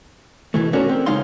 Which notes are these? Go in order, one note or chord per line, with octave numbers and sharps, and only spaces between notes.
B2 E3 A3
C#4 F#4 A4 A#4 C#5 D5
C4
C#2 G#3 D#4 F5 C6